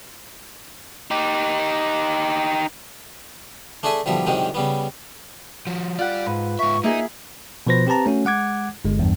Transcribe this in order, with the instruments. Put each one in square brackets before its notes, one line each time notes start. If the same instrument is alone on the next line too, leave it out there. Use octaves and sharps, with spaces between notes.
[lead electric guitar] D#4 G4
[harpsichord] A3 D4 G#4 A4 E5 G#5
B1 D3 F3 G3 E5
C2 F#2 D#3 G#3 C4
C#3 G3 B3
[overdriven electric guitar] F3 F#4
[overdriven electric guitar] G3 D5 [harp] F4 F#5
[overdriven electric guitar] G#2 [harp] B4
[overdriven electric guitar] G#2 E5 [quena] C#6
[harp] A#3 G#4 [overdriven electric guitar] D#4 [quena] E5
[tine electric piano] B2 F3 B4 C5 A#6
C4 G4 B4 A5 A#5
A3 C#4 F#4
G#3 F#5 D6 G#6
G1 G#3
E2 G2